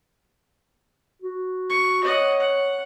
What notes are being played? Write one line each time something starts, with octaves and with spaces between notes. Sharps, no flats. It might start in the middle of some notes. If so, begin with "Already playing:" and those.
F#4
C#6
C#5 D#5 F#5
F#5